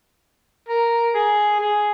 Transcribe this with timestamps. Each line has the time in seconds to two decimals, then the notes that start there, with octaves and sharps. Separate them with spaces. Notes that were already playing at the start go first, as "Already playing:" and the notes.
0.69 A#4
1.15 G#4
1.60 G#4